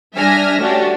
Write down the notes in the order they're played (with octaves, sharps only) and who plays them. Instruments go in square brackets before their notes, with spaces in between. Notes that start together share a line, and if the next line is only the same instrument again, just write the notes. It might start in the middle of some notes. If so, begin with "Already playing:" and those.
[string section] G3 D4 E5 G#5 F6 A#6
A3 C#4 D4 F#4 G4